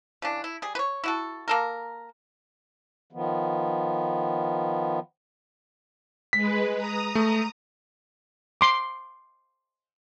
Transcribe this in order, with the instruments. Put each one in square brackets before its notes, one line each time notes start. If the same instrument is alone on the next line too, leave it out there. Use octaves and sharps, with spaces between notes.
[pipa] C#3 E3 D4
E4
G3 G#4
B4 C#5
E4 F#4 A4
A#3 A4 A#4
[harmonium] D#3 F3 B3
[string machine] G#3 B4 [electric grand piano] B6
[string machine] A#5 D#6
[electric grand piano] A3
[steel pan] C6 D6